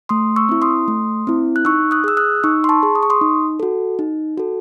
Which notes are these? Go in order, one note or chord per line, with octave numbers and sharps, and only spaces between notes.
A3 C6 D#6
C#6 E6
C4 E4
C6 D#6
A3
C4 E4
F#6
D#4 C#6 E6
D#6 F#6
G#4 E6
D#6 F#6
D#4 C#6 E6
C6
A5 C#6
G#4
D#6
C#6
C6 D#6
D#4
F#4 A4
D#4
F#4 A4